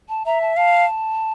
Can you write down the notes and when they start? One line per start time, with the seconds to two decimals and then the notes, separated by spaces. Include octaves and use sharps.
0.09 A5
0.26 E5 A#5
0.41 A5
0.57 F5 A5